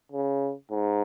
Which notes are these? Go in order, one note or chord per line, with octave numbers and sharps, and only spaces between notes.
C#3
G#2